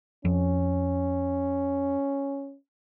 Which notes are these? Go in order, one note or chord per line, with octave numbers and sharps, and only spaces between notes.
F2 C#4